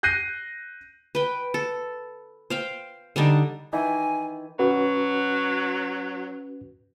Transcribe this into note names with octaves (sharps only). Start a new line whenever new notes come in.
F#6 G6 A#6 C7 D#7
B4 G5
A4
C5 F5 G5
D3 G3 D4 D#4
D#3 E3 E4 G#5
F#3 C#4 F#4 B4